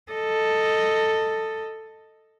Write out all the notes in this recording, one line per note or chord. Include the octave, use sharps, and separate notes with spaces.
A4 D#5